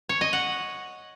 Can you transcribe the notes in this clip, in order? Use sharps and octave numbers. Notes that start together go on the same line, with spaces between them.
C#5
D#5
F#5